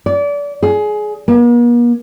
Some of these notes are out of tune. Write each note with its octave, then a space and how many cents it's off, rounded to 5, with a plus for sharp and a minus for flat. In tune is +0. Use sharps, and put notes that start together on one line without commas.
D5 -30
G#4 +20
A#3 +45